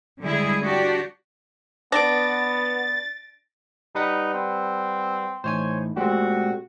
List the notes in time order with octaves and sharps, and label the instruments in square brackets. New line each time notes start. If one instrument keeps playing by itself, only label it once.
[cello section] D3 G3 G#3 E4 G#4
D4 F#4 G4
[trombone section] B3 [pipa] D4 [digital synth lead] A6 [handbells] A#6 D7
[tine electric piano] G3 B4 F#5 [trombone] D#4
[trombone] C4
[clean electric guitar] A2 E3 D#4 [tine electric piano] C5 C#5 G#5
[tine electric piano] A#2 C4 [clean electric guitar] G#3 A3 G4 [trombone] F#4